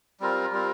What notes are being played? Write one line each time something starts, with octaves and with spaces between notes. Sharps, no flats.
G3 C4 F4 A#4
G3 C4 F4 A#4